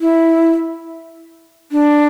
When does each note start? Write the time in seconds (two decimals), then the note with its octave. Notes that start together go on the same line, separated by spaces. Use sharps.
0.01 E4
1.72 D4